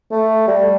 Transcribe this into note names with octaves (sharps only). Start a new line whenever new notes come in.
A3
G3